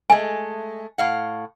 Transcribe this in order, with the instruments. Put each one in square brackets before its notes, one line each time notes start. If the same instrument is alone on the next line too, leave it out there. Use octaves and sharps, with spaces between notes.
[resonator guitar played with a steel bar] G#3 A3 [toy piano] G#5
[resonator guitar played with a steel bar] A2 F5 F#5